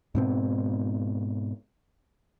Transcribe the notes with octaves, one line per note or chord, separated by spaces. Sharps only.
G#2 B2 C4